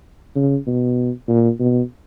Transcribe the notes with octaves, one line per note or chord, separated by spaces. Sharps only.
C#3
B2
A#2
B2